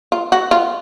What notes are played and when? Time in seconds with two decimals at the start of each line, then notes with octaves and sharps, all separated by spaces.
0.12 F4
0.32 F#4
0.51 F4